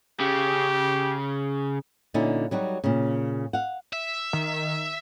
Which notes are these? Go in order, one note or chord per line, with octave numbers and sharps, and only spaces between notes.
C#3 G4
A#2 D3 C#4 D#4 E4
F#3 G3 D#4 F#4
A#2 C#3
F5 F#5
E5
D#3